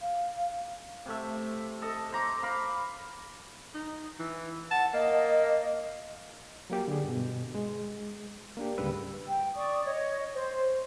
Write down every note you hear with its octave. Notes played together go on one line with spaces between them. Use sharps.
F5
C3 A3 E5
A4 D#5
C5 A#5 D6
F5 B5 D6
D#4
E3
F#5 A5
A#3 D#5
F#3 A#3 G4
D3 G#4
G2 B2
G#3
A#3 D4 G4
D2 G#2 C#3 G3 B4 E6
G5
D5 C#6 D#6
C#5 D#5
C5